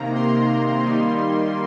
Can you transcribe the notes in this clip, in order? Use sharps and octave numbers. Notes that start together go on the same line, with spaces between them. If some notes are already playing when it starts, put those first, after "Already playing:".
Already playing: C3 D#3 A#3 A#5
C6
D#3 G3 A#3 D#4